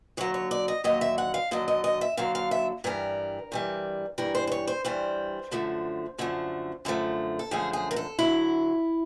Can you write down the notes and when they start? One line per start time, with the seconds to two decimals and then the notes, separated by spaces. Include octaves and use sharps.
0.17 D#2 D3 F#3 C#5
0.34 C#5
0.51 D5
0.68 D#5
0.84 D#2 D3 F#3 D#5
1.01 E5
1.18 F#5
1.34 F5
1.51 D#2 D3 F#3 D#5
1.68 D#5
1.84 D#5
2.01 E5
2.17 D#2 D3 F#3 F5
2.35 F5
2.51 E5
2.84 G2 E3 G3 A#4
3.52 G2 E3 G3
4.18 G2 E3 G3 A#4
4.35 C5
4.47 C5
4.52 C#5
4.67 C5
4.85 G2 E3 G3 C5
5.51 F#2 D3 F3 A3
6.18 F#2 D3 F3 A3
6.85 F#2 D3 F3 A3
7.39 A4
7.51 F#2 D3 F3 A3 G#4
7.73 G#4
7.91 A#4
7.96 A4
8.19 D3 F#3 E4